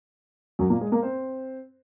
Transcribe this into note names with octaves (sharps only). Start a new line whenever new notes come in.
F#2 F#3
A#2 A#3
G#3 G#4
A#3 A#4
C4 C5